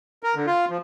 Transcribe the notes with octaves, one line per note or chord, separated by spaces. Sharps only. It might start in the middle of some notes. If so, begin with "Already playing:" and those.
A#4
D3
F4
F3